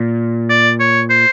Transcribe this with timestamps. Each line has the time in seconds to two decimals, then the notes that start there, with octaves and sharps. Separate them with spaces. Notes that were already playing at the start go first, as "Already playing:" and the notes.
Already playing: A#2
0.50 D5
0.80 C#5
1.10 C5